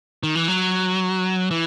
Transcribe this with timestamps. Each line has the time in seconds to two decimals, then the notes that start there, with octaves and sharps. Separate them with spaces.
0.23 D#3
0.35 E3
0.48 F#3
1.51 E3